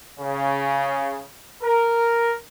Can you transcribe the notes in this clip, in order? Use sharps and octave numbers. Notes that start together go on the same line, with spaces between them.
C#3
A#4